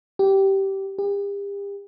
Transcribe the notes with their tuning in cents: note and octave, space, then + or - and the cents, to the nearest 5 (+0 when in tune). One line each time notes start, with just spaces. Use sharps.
G4 -15
G4 +40